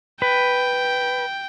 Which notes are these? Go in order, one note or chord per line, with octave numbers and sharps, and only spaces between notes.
B4 G5